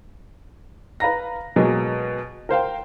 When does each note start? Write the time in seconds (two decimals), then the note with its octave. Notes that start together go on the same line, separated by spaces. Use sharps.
1.00 B4 F5 A#5 A#6
1.56 B2 F#3 G#3 A#3
2.49 A#4 C5 F5 G5